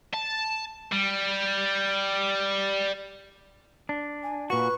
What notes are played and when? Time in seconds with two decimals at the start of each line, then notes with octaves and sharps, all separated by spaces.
0.14 A5
0.92 G3
3.89 D4
4.23 G#5
4.50 A#2 F#4 B4 C#6